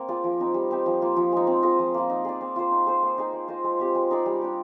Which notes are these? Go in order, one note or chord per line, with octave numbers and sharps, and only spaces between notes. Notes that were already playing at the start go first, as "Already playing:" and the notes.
Already playing: A#3 C4 A#4 C5
F4 G#4 D5
F3
C4 D#4
G3
C4 D#4 G4
F3
A#3 F4
F3
G#3 D#4
C4
F4 G#4 D#5
F3
A#3 F4
D#4
G#4 D5
C4
F4 C5
D#4
G#4 C5
A#3
D#4 G#4
A#3
F4 C5 D#5
G#3
C4 G4
G#3
D#4 G#4 D5
G3
D4 G4